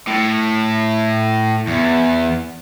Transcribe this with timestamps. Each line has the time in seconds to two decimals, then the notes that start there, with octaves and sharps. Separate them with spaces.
0.07 A2
1.67 E2